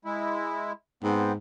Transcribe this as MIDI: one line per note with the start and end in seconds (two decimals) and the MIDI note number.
0.05 0.72 56
0.05 0.72 64
1.03 1.36 44
1.03 1.33 59
1.03 1.33 60